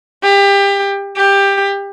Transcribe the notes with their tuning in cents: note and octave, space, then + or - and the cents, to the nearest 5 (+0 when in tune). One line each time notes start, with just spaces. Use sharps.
G4 +25
G4 +15